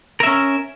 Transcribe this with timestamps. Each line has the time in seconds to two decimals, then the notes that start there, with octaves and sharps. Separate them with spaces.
0.20 A#4
0.23 E5
0.27 C#4